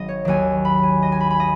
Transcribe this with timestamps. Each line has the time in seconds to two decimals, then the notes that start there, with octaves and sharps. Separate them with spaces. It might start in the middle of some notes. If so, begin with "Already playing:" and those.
Already playing: G#1 F#3 D#5
0.08 C#5
0.25 D#2 D#3 F#3 G#5
0.65 B5
0.83 G#5
1.02 D#5
1.12 G#5
1.20 B5
1.30 B5
1.40 D#5